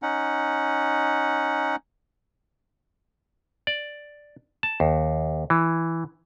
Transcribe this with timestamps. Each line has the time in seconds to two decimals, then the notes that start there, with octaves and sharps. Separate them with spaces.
0.02 C#4 D#4 F#5
3.67 D5
4.63 A5
4.80 D#2
5.50 E3